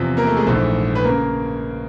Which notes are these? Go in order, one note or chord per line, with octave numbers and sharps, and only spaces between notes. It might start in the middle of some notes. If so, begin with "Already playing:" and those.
Already playing: E2 C3 F3
A#3 A#4
A3 A4
G#3 G#4
A#1 G#2 E3 A3 A4
B4
C#3 A#3 A#4